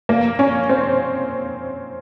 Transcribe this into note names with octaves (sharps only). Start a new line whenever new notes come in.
A#3
C#4
C4